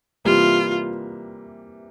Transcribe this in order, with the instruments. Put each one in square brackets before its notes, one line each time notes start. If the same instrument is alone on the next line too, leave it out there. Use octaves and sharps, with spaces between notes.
[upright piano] C3 E3 G3 A#3 [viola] F4